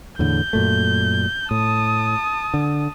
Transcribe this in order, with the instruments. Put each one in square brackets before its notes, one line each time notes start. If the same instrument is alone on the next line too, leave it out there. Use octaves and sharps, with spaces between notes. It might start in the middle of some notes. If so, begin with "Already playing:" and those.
[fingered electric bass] E2 A2 D3 [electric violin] G6
[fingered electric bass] F#2 A#2 A3
[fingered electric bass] A2 [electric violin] A5 D#6
[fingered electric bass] D3